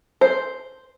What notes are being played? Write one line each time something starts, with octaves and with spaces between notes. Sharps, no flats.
C5